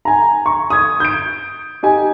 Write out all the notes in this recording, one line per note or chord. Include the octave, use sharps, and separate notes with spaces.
G#5 A#5
C#6
D#6 G#6
G6 D7
D#4 G4 G#5